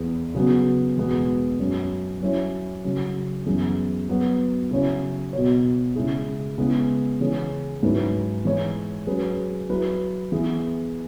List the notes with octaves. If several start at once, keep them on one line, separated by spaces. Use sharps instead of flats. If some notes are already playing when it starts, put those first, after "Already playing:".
Already playing: E2 E3 B3 G#4 B4
C#3 F#3 B3 F#4
E2 B2 G#3 B3 F#4
F#2 F#3 C#4
F#3 C#4 E4 C#5
C#3 F#3 C#4
F#2 E3 B3 G#4
F#3 B3 F#4 B4
C#3 F#3 C#4 E4 C#5
B2 B3 F#4 C#5
C#3 G#3 E4 G#4
C#3 G#3 B3 E4
C#3 E3 C#4 G#4
G#2 F#3 C#4 E4 B4
E3 G#3 E4 C#5
F#3 C#4 G#4 B4
F#3 E4 B4
E3 B3 E4 G#4